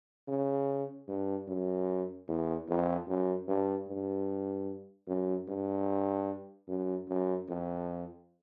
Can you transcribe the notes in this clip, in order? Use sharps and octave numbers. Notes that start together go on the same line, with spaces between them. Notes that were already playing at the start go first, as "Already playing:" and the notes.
C#3
G2
F#2
E2
F2
F#2
G2
G2
F#2
G2
F#2
F#2
F2